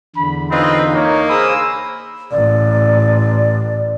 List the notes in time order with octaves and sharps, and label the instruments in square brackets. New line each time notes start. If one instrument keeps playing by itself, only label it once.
[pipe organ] E2 D3 [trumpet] B5
[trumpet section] C4 F4 B4 [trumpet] D#4 [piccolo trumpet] D#5
[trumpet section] A#3 [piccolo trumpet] C#5
[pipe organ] G#4 C5 D#6 [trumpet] B5 [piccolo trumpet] E6
[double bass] A1 [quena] D5